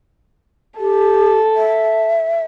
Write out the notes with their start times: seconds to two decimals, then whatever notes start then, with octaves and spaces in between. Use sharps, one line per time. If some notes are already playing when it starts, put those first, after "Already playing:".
0.79 G4 A4
1.56 E5